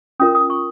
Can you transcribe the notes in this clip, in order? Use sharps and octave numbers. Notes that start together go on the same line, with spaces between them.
C#4 F4 A#4 D#6
D#6
C#6